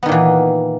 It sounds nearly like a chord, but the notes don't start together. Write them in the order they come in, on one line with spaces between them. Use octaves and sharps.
B3 D#3 A#2 E3